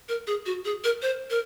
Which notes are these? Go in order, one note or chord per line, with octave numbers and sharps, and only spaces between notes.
A#4
G#4
F#4
G#4
A#4
C5
A#4